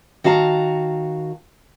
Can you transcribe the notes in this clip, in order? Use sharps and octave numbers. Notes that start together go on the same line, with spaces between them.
D#3 F#4 F5 A5 A#5